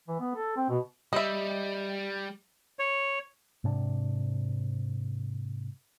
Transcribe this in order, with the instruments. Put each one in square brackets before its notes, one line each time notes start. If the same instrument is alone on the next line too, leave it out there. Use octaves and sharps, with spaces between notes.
[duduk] E3
B3
A4
C4
B2
[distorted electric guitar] G3 [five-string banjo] D#5 E5
[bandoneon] C#5
[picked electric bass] G#2 C3 C#4 D4